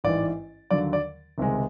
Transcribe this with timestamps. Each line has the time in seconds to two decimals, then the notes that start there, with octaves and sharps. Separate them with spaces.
0.04 A1 G#2 E3 D5
0.71 D#2 D3 F#3 D5
0.93 D5
1.38 C#2 C3 D#3 G#3